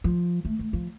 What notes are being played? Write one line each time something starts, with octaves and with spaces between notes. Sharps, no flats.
F3
A3
A3
F3